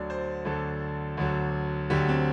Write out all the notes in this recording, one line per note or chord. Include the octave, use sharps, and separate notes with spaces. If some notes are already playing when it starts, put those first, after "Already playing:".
Already playing: D2 D3 F#3 D5
C5
D2 D3 F#3 A4
D2 D3 F#3
D2 D3 F#3 G4
C4